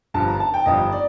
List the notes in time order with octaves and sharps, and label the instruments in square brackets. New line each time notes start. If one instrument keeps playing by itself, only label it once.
[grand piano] G1 G2 F3 [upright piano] A5
[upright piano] A#5
A5
G5
[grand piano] G1 G2 F3 [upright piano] D#5
[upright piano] D5